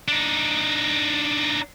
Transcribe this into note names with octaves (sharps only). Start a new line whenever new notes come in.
D4 D#4